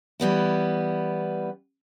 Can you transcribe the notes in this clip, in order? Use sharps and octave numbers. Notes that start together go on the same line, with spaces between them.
E3 G3 B3 E4